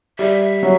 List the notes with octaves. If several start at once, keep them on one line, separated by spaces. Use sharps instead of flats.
G3 E5
F#3